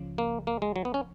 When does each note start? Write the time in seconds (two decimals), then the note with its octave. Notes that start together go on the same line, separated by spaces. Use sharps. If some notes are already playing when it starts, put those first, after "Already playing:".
Already playing: C#2 C#3 F3
0.18 A#3
0.47 A#3
0.62 G#3
0.76 F#3
0.85 B3
0.94 C#4